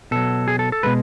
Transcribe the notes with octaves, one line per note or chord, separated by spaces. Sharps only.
B2 F#3 A4
G#4
A4
A4
B2 G#3 B4